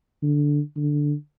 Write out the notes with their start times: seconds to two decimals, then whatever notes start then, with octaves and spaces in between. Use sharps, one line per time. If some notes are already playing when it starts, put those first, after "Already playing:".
0.23 D3
0.76 D3